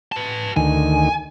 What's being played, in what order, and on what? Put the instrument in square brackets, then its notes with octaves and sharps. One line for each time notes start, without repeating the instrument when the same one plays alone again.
[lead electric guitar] B4 A5
[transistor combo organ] D2 D#3 [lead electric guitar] G#5